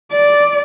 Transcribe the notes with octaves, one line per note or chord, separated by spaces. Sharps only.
D5